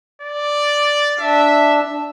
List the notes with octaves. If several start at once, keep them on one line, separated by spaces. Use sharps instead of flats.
D5
D4 E5